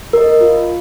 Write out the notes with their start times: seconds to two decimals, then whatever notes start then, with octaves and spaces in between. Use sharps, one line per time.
0.13 A#4 D#5
0.41 F4